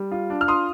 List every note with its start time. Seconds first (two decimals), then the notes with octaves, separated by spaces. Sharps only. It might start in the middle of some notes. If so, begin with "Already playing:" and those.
Already playing: G3
0.11 F4
0.30 D4
0.41 F6
0.48 F4 C6 D#6